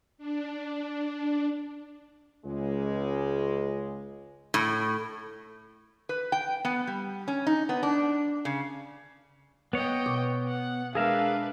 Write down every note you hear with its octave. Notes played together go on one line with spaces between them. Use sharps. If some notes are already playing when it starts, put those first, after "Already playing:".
D4
C#2 G#3
A2
B4
G5
B3
G3
C#4
D#4
B3
D4
C#3
B3 C#5 D#5 G5
B2 C#6 D6
F#5
G#3 D4 G#4 A#4 B4 E5 F5 E6